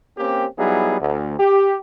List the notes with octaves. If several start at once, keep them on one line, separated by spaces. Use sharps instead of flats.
A#3 C4 C#4 G4
F#3 G3 B3 D#4 E4 G#4
D2
G4